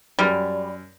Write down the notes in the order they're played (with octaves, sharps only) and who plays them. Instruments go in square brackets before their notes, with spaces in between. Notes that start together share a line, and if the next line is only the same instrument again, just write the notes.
[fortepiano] F#2 F6 [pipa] G3